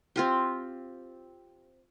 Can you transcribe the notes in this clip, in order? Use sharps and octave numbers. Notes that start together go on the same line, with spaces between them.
C4 F4 G4